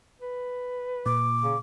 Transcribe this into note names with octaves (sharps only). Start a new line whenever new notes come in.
B4
A#2 D6
C#3